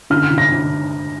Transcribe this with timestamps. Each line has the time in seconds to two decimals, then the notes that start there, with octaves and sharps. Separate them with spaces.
0.10 D3 F6
0.30 D3
0.38 A#6
0.52 D3